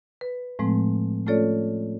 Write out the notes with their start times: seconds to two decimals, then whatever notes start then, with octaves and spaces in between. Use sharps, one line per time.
0.21 B4
0.59 A2 F3 G#3 A3 C4
1.27 A3 C#4 F4 A4 C#5 D5